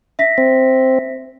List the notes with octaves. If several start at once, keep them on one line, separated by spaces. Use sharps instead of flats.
E5 A#6 B6
C4